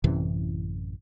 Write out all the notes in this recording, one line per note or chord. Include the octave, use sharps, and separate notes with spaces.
A1 F#2 C3 E3